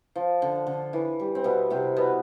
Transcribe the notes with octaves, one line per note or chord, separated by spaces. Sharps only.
F3
D3
D3
E3
G3
C4
B2 B3
C3 C4
B2 B3